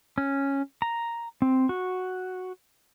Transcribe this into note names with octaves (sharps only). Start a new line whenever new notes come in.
C#4
A#5
C4
F#4